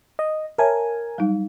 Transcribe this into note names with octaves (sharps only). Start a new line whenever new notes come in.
D#5
A#4 C#5 E5 G#5 A5
F#3 G3 D#4